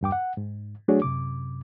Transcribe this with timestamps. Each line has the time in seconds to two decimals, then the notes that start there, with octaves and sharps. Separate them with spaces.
0.01 E2 G2 G5 D6
0.12 F#5
0.37 G#2
0.88 F#3 A3 D4 F#4 G#4 C#5
1.02 F#2 C3 D6